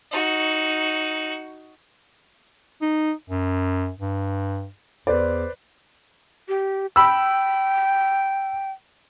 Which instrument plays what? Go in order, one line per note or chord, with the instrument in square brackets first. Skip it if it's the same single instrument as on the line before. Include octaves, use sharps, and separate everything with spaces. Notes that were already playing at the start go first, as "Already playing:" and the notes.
[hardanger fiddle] D#4 F#4
[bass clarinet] D#4
F#2
G2
[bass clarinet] E2 [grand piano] B4 C5 D5
[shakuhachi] G4
[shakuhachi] G5 [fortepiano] B5 E6